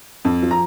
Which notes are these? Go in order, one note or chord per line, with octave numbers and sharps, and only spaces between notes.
F2
F3
A#5